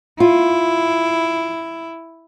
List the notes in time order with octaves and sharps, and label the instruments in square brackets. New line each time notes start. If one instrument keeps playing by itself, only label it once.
[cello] E4 [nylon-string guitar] F4